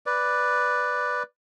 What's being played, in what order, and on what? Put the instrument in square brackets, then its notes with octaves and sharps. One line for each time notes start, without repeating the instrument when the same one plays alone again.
[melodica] B4 D5